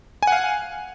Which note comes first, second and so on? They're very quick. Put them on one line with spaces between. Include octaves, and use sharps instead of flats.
G#5 F#5 F5